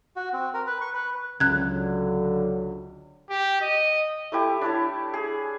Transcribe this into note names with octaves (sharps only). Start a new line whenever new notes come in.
F#4
C4
A#4
B4
C#6
B4
C#2 D3 F#3 F#6 G#6
G4
D#5
A3 E4 G4 C#6
D4 E4 C#5 A5
G#4